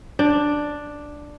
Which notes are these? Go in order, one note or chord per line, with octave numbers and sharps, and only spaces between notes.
D4